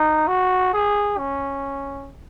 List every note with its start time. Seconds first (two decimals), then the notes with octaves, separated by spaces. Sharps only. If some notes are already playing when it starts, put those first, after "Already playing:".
Already playing: D#4
0.28 F#4
0.73 G#4
1.18 C#4